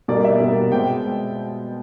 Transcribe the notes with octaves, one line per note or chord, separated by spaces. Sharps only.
B2 G3 A#3 D5
E5
B2 G3 A#3
B2 G#3 C4 G5